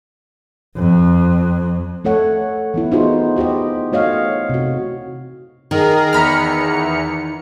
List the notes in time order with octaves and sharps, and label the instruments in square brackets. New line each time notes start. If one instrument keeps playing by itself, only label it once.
[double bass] F2
[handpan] A3 A4 C#5 F#5
E3 B3 E4
B3 D#4 F4 F#4 G#4 C5
F#4 G4 C5 D#5
A3 F#4 C#5 D#5 F5
C3 F#4
[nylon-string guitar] D#3 [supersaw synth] G#4 A#4
[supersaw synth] E2 C#7 [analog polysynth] A#5 B5 F6